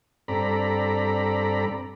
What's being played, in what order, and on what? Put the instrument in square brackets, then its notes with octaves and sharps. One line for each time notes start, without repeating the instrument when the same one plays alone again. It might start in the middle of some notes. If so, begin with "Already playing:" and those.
[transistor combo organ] G2 C4 A4 D5 A#5 B5